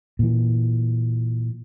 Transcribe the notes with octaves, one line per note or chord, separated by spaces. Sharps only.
A#2 E3